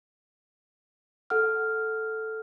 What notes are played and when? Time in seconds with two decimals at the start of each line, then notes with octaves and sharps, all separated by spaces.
1.30 A4 F#5 F6